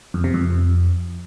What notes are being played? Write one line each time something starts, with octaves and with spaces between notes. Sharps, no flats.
F2
C3
F2